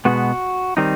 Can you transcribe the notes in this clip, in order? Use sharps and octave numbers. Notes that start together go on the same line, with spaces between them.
B2 G#3 B3 F#4
D#3 G3 C4 D#4